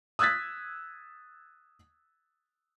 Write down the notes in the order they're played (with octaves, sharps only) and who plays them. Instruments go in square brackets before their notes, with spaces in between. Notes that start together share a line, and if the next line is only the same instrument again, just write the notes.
[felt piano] D#6 E6 F#6 G#6 A6 B6